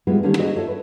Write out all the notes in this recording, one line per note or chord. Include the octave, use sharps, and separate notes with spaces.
G3 G#3 B3 E4 F4
D3 D#3 A#3 C#4 D#4 G4
F#4 G#4 C5 D#5
F4 A4 C#5 E5
B4